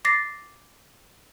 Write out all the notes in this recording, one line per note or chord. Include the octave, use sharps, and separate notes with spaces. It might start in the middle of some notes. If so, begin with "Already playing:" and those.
D6 A6 A#6 C7